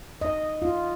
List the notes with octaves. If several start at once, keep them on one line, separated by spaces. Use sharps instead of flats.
D#5
F4